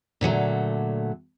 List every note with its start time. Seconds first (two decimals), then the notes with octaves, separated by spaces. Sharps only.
0.21 A#2 D3 F#3 A3